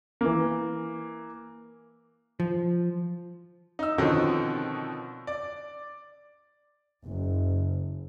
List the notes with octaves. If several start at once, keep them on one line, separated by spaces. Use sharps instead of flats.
E3 A#3
F3
D#4 E6
B2 D3 D#3 F3 C4 C#4
D5
F#1